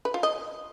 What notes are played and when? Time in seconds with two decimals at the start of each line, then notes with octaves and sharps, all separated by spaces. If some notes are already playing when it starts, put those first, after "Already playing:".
0.05 B4
0.14 F4
0.23 D#5